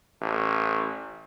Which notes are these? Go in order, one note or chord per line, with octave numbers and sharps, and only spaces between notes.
A1